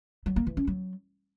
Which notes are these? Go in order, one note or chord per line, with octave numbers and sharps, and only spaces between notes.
F#3
A#3
E3
C#4
F#3